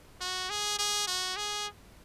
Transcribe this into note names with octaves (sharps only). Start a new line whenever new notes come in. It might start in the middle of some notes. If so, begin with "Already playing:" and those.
F#4
G#4
G#4
F#4
G#4